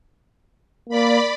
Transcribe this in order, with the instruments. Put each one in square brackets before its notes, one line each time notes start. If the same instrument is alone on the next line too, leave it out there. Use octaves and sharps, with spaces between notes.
[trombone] A#3 [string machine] D5 B5